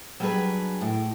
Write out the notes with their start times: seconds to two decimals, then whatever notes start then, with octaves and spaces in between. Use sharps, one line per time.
0.20 F#3 G3 D4 F#4 G#4 B4
0.81 A2